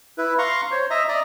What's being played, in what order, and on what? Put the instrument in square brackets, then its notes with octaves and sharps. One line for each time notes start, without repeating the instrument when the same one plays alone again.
[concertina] E4 B4
F5 A#5 C6 C#6
C5 C#5
D#5 E5 A#5
D5 D#5 A#5